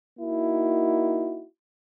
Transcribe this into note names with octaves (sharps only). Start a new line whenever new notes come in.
A#3 D#4 E4 F#4